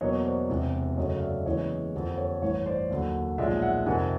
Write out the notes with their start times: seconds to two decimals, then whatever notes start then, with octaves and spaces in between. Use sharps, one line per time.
0.01 E2 B2 F#3 A#3 C#5 D#5
0.25 C5 D5
0.50 E1 E2 C3
0.97 F#2 C#3 F#3 A3 C#5 D#5
1.16 F5
1.22 D5 E5
1.46 F#1 E2 C#3 E3 G#3 C#5 D#5
1.94 F2 D3 G3 A#3
2.17 C#5
2.42 A1 G2 E3 C#5
2.66 C5 D5
2.90 D#2 D3 F#3
3.38 B1 A#2 F3 G#3 D5 E5
3.62 E5 F#5
3.86 F2 C3 D#3 G3 F#5 G#5